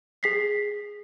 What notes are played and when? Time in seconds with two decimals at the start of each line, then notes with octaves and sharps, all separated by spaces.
0.23 G#4 B6 C7